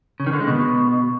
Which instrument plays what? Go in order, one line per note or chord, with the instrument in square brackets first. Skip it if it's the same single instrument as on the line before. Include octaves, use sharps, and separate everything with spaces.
[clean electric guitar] C#3
D#3
D3
G#3
B2